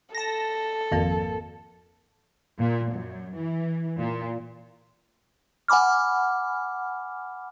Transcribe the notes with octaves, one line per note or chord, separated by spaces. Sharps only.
A4 A5 A#6
G#1 F2 A#3
A#2
F#2
E3
A#2
F#5 G#5 B5 D6 F6